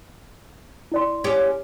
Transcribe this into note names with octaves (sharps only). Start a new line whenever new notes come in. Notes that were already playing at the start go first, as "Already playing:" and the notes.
E4 D5 C6
C#4 G4